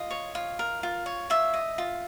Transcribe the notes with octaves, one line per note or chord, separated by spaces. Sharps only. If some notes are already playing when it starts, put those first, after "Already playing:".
Already playing: F4 D#5
C#5
F4
A#4
F4
C#5
F4 E5
D#5
F4